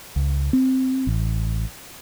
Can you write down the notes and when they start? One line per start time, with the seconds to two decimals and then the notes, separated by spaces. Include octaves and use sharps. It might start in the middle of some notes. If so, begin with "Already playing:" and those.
0.16 C#2
0.53 C4
1.07 A1